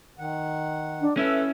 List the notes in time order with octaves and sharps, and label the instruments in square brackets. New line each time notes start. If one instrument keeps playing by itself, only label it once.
[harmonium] D#3 F#5
[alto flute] D4
[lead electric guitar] C#4 E4 [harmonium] A4 B4 [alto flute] E5